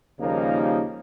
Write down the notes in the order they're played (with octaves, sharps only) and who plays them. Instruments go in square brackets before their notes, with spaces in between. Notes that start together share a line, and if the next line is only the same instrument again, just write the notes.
[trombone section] D#2 C#3 F3 G3 A#3 D#4